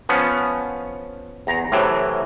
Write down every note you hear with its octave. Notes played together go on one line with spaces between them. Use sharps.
F3 B3 C#4
E2 A#5
A2 C3 E3 F#3